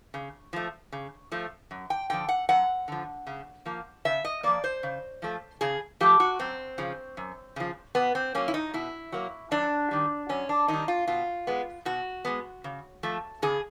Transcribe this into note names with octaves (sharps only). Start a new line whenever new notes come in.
C#3
F3 A3
C#3
F3 A3
F#2
G5
D3 F3 G5
F#5
F#2 F#5
D3 F3
C#3
F3 A#3
C#3 E5
D#5
F3 A#3 D5
C5
C#3
F3 A3
C#3 G#4
F3 A3 G4
F#4
F#2 C4
C#3 F3
F#2
C#3 F3
B2 B3
C4
F#3 A#3 C#4
E4
D#4
B2 E4
F#3 A#3
F#2 D4
D#3 G3
F#2 C#4
D4
D#3 G3 D#4
F4
B2 F4
G#3 B3
B2 F#4
G#3 B3
C#3
F3 A3
C#3 G#4